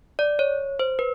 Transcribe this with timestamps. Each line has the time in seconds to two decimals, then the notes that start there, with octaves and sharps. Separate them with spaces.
0.19 D5
0.39 C#5
0.79 C5
0.99 B4